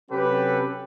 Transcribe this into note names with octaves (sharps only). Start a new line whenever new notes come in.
C3 F#3 C#4 G4 A4 B4